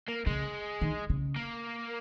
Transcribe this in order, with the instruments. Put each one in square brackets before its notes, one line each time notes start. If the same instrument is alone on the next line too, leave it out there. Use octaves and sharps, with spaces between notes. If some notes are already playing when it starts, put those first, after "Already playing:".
[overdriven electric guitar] A#3
[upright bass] C#3 [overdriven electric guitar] G#3
[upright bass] D#3
C#3
[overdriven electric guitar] A#3